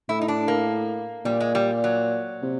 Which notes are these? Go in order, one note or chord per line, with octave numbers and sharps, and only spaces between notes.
A2 E4
D#4
D4
A#3
A#2 G3
G#3
G3
F#3
C3